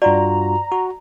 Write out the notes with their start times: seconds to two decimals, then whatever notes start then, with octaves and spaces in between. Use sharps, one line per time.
0.02 G2 F4 F#4 D5 A#5
0.72 F#4